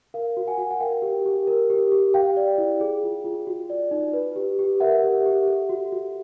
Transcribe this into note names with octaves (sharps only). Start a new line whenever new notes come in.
A#4 F5
F#4
F#5 G#5
F#4
F#5
A#4 F5 G5
G4
G4
A#4
G4
G4
G4 F5 G5
D5
E4
G#4
F4
F4
F#4
D5
D#4
B4
G4
G4
A#4 E5 F#5
G4
G4
A4
F#4
F#4